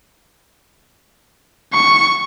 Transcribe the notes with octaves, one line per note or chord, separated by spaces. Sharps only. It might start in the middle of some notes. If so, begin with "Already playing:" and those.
C#6